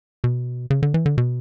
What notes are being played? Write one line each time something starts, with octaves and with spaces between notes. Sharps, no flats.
B2
C#3
D3
E3
D3
B2